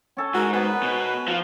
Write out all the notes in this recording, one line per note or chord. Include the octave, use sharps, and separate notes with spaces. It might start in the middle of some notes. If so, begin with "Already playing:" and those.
C#4 A4 G#5
G#2 F#4 A#4
B3 B4 G#5
B2
F3 F4